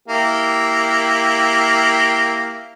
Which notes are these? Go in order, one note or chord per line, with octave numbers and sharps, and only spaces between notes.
A#3 E4 G4